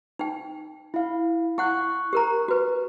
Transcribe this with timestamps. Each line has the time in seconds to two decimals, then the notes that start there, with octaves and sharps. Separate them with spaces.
0.19 D#4 G5
0.94 E4 F5
1.58 E4 F#5 C#6 F#6
2.13 G4 A#4 A#5
2.48 F#4 B4